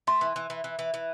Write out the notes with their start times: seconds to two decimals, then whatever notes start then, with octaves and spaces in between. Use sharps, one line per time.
0.07 A3 C6
0.21 E3
0.36 E3
0.50 E3
0.64 E3
0.79 E3
0.94 E3